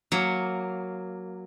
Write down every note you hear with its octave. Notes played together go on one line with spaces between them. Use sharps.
F#3 A#3